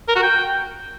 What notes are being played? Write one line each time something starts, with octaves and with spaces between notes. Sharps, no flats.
A#4
F#4
G5